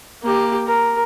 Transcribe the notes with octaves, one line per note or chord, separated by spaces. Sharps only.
A#3 G4
A#4